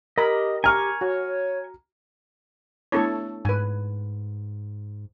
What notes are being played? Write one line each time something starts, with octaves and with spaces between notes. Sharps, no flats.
G4 A#4 D#5 B5
G#5 A#5 C#6 F6
F#4 C#5
A3 B3 D4 E4 A4 C#5
G#2 B4 G#5